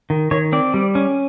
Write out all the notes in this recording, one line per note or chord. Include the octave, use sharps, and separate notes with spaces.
D#3
D#3 C#5
C4 D5
G3
C#4